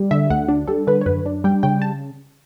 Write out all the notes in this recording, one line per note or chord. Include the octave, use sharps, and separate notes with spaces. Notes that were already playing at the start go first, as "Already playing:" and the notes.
Already playing: G3
D3 E5
D2 F#5
D4
G3 A4
D3 B4
C#5
F#2 B4
D4
G3 G5
C#3 G5
A5